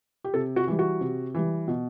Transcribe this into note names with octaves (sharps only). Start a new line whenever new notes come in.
G4
C3 A4
F#4
E3 G3
F#4
C3
E3 G3
B2